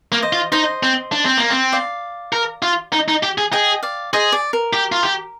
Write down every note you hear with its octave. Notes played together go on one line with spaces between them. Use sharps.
A#3
C5 D#5
F4
D#4 C5 D#5
C4
D4
C4
A#3
C4
D5 F5
A#4
F4
D#4
D#4
G4
G#4
G#4 D#5 G5
D5 F5
G#4 C5 D#5
D5
A#4
G4
F4
G4